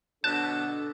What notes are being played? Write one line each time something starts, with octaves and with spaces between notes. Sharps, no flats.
B2 D3 F#3 D4 A4 A5 F#6